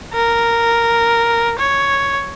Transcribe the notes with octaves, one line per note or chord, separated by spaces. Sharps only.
A#4
C#5